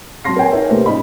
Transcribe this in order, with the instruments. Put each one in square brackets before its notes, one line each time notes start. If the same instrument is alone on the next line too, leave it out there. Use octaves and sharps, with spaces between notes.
[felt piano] F#3 C4 A5 C6 A#6 C7
A#4 C#5 G5 G#5
D#4 A#4 C#5 E5
C3 A3 A#3 G4 B4 C5
A#2 G3 C#4 D#4 D#5 B5